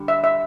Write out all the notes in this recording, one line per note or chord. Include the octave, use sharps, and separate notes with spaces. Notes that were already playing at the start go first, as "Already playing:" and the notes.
Already playing: D3 G3
E5
E5